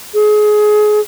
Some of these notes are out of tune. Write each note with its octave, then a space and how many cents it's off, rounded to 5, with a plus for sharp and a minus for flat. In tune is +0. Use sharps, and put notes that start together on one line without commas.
G#4 +25